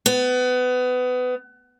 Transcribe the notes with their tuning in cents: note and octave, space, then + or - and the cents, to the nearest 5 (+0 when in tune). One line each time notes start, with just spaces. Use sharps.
B3 +25